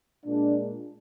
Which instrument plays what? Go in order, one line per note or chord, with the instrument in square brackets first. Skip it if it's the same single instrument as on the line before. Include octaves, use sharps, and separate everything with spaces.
[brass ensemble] A#2 G#3 D4